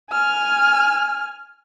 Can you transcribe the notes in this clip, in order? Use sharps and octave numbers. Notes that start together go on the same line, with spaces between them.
G#5 F6